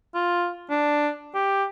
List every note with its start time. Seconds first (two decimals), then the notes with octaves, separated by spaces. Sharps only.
0.14 F4
0.70 D4
1.34 G4